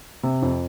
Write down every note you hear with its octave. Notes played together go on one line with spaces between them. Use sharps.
C3
F2